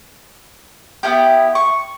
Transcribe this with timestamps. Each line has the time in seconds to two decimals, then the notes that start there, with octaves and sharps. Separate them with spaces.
1.03 B3 C#4 E4 G4
1.55 C#6